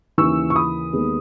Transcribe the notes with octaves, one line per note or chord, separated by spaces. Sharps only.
D#2 C#3 E3 C#6 E6
C#6
B5 D#6
D#2 D#3 G#3 B3